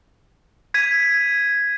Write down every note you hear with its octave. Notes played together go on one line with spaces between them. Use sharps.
G#6 B6 D#7